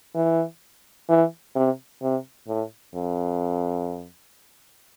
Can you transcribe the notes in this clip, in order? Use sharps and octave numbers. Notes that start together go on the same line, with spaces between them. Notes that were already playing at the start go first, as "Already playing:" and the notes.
E3
E3
C3
C3
A2
F2